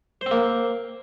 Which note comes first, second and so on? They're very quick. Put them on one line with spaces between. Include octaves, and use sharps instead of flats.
C5 C4 A#3